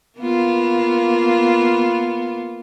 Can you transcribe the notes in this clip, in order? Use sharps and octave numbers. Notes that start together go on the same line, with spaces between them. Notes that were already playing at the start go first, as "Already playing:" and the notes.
A#3 B3 F4